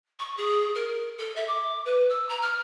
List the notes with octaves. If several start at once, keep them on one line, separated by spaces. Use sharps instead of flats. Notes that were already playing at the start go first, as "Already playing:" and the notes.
C#6
G#4
A#4
A4
E5
D6
B4
E6
A#5
F6